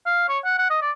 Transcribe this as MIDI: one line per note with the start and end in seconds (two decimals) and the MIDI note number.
0.06 0.24 77
0.29 0.39 73
0.45 0.56 78
0.59 0.68 78
0.70 0.79 75
0.82 0.91 74